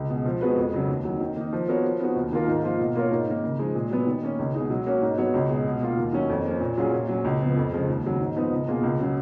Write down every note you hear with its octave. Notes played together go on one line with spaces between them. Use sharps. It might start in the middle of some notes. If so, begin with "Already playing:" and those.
Already playing: C#2
B2 G#3
F3
G#3 B3 F#4 B4
F2
C#3 F#3
D#2
D#3 F#3
D#3
A#3 D#4
F3
B3 F#4 A#4 C#5
F3
B3 D#4 F#4
D#2
D#3 A#3 F4 A#4
G#2
F3 A#3 F4
B2
A#3 F4 A#4 C#5
G#2
D#3 A#3
C#3
F3 G#3 D#4
A#2
F#3 B3
D#3
A#3 C#4
C#2
B2 G#3 D#4
F#3
A#3 C#4 F#4 C#5
G#2
F#3 B3 F#4 C#5
C#2
B2 G#3
B2
A#3 F4
D#2
D#3 F#3 C#4
F2
F3 A#3 C#4
A#2
F#3 C#4 F4 G#4
A#2
F#3 C#4
C#2
C#3 F3 B3
F2
C#3 F3 G#3
D#2
C#3 F#3
G#2
F3 B3 D#4
C#2
B2 A#3 F4 G#4
C#2
C#3 F#3